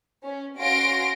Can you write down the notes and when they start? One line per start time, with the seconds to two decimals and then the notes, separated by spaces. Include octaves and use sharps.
0.24 C#4
0.57 C#4 F#4 F5 C6 A#6 D7